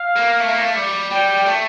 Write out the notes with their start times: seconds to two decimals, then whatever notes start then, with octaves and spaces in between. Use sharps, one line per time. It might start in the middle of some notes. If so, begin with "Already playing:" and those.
Already playing: F5
0.16 A#3
0.40 A3
0.50 A#3
0.59 A3
0.75 G3
1.11 G3 G5
1.33 G5
1.46 A3